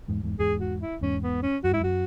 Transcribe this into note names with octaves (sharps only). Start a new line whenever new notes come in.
E2 G#2
E2 G#2
E2 G#2 G#4
F#4
E4
E2 G#2 C#4
B3
C#4
F#2 F#4
G#2 E4
F#2 F#4